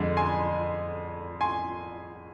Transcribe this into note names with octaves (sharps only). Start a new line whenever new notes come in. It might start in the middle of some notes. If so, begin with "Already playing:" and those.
Already playing: F2 D3 G#3
G#5 C6
G#5 C6